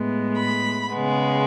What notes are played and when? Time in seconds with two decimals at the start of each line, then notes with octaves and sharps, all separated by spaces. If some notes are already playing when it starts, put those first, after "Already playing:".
Already playing: A2 G#3 B3
0.38 B5
0.92 C#3 G#3 B3